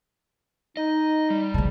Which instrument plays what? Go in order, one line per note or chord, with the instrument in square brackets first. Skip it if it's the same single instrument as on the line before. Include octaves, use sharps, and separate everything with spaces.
[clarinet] D#4 [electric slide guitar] D#5
[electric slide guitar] G3
[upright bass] C#3 F3 [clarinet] A5